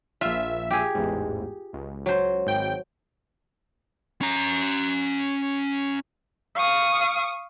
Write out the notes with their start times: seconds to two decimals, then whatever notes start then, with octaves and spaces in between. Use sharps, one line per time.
0.21 A#1 F4 E5
0.71 G4 G#4
0.95 A1 E2 G#2
1.73 C#2
2.06 F#3 C5
2.47 G#1 G5
4.21 C#4 A#5
6.56 F5 C#6 D#6